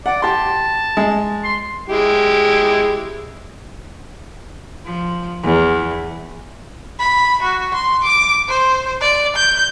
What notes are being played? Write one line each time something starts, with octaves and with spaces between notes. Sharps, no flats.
D5 F#5
G4 A5 C6
G#3
C6
G#3 E4 G4
F3
E2
B5
F#4
C6
D6
C5
D5
G6